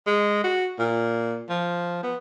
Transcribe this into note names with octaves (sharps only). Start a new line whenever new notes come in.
G#3
F#4
A#2
F3
B3